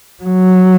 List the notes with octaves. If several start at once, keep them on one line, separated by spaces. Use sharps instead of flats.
F#3